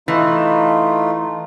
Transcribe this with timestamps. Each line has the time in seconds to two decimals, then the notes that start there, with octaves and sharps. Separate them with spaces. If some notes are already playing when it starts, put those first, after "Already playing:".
0.08 E3 A3 D#4 F4